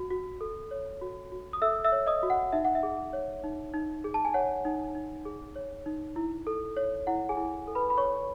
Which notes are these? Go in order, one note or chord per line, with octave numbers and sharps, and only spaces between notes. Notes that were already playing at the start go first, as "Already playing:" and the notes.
Already playing: F#4
F#4
A4
C#5
F#4
F#4
D#6
A4 E5 E6
E5 E6
C#5
D#5 D#6
F#4
F#5
D#4 E5
F#5
E5
G#4
C#5
D#4
D#4
G#4
A5
G#5
C#5 F#5
D#4
D#4
G#4
C#5
D#4
E4
A4
C#5
E4 F#5
G#4 G#5
E4
A4
B4 B5
B5
C#5 C#6